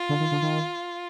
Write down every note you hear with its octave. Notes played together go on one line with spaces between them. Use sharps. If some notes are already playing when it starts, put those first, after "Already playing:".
Already playing: F4
D3
D#3
D3
D#3